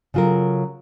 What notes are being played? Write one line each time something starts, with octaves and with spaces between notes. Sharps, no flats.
C#3 F#3 F4 A4 A#4